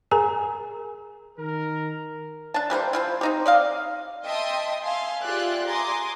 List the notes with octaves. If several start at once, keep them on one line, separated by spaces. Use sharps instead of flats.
G#4 A#4 G#5 A#5
D#3 A#4
D4 A5
E3 G3 A#3 C5
E4 F4 C5
C4 D#4 G4
D5 D#5 F5
D#5 E5 G5 A5 C6 D#6
E5 F5 G#5 C6
F4 G4 G#4 D5 E5 F#6
G#5 A#5 C6 D6 D#6